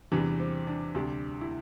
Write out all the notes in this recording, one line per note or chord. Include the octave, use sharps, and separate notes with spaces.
E2 C3 E3 G3 D4
C4
D4
D2 C3 G3 D4
E4